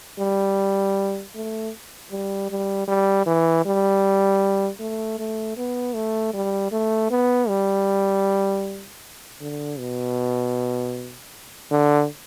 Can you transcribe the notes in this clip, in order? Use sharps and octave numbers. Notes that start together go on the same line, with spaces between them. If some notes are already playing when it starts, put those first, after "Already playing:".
G3
A3
G3
G3
G3
E3
G3
A3
A3
B3
A3
G3
A3
B3
G3
D3
B2
D3